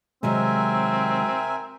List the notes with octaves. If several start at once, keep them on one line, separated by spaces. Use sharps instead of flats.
C3 D#3 F#3 G#3 C4 A#4 E5 G#5